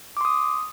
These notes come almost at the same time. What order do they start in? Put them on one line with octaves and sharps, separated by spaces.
D6 C6 D#6